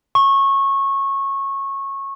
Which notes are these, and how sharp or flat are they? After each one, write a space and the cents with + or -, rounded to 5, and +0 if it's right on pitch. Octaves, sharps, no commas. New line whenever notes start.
C#6 -20